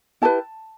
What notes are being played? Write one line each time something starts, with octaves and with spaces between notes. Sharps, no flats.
E4 G4 B4 A5